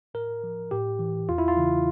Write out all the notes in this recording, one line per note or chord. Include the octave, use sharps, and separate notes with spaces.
A2 A#4
F3
A2 G4
E3
E2 F4
E4
F4
C#3 E3